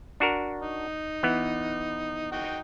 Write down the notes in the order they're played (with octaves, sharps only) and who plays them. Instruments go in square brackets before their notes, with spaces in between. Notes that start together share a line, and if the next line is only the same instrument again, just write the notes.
[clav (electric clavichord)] D4 F#4 A#4
[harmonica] D#4
[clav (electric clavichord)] E3 B3
[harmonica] D#4 F#4 G5